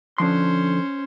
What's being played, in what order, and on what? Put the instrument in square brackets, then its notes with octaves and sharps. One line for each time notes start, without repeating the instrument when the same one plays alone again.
[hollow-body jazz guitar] D3 F3 C6 [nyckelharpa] C#4 C5